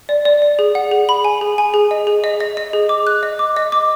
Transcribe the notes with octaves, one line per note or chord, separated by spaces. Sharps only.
D5
D5
D5
G#4
F#5
G#4
B5
G#5
G#4
G#5
G#4
D#5
G#4
D#5
D#5
D#5
G#4
D6
F#6
D#5
D6
D#5
D6